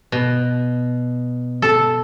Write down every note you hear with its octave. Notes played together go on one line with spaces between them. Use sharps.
B2
A4